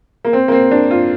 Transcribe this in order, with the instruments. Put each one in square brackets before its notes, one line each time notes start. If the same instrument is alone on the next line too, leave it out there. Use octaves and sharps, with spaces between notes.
[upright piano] A#3
C4
A#3
C4
D4
F4